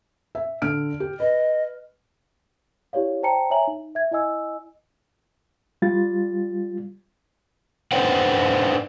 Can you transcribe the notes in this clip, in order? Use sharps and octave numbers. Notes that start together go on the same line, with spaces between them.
E5
D3 F6 D7
G4
B4 D#5
E4 G4 C#5 D5 F5
C5 D5 G5 A5 A#5 C#7
C#5 E5 G#5 A#5 F#7
D#4
E5 G#6
E4 D#5 G#5 E6
G3 F4 A6
D4 D#4 B4 C5 F#5 G5